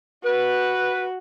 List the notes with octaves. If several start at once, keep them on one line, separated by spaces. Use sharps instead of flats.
F#4 B4